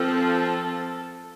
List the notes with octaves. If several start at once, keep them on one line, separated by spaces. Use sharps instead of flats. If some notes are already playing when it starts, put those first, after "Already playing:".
Already playing: F3 C4 A4